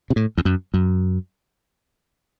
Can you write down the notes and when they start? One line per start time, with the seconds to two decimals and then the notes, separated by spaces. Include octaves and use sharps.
0.10 C3
0.16 A2
0.38 E2
0.45 F#2
0.74 F#2